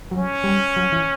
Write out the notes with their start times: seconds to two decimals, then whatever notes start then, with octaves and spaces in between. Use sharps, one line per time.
0.11 F#3 C#4
0.44 G3
0.77 F#3
0.93 E3